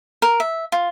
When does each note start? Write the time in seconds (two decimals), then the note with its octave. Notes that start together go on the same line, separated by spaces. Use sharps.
0.22 A#4
0.40 E5
0.72 F4